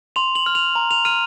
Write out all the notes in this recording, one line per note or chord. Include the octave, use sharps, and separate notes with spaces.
C6 F7
F#7
F6
F7
A#5
F7
F6 D#7